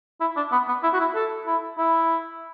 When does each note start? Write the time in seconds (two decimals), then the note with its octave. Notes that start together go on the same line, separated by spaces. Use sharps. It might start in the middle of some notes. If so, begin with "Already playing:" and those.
0.21 E4
0.37 D4
0.52 B3
0.68 B3
0.84 E4
0.94 F#4
1.00 E4
1.15 A4
1.47 E4
1.78 E4